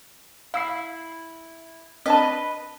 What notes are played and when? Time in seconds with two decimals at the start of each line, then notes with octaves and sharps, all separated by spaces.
0.54 E4 F5 E6 C7
2.06 C4 D4 B4 D#5 A5